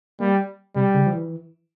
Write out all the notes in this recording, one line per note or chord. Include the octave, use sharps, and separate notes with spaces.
G3 A#3
C3 G3
C#3
F3
E3